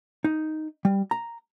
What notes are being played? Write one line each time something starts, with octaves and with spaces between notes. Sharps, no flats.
D#4
G3
A#5